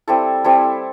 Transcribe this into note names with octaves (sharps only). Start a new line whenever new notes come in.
G3 C4 E4 A4
G3 C4 E4 A4